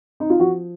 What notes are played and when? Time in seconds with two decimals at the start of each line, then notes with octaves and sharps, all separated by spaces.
0.20 D#4
0.30 F4
0.40 F3 F#4